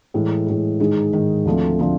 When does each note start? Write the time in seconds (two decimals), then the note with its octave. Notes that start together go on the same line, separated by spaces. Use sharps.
0.14 A2 E3 G#3
0.46 A2 E3 G#3
0.80 G#2 D#3 G#3
1.13 G#2 D#3 G#3
1.45 D2 D3 F3 A3 C4
1.79 D3 F3 A3 C4